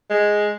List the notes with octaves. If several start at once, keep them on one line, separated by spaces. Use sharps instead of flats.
G#3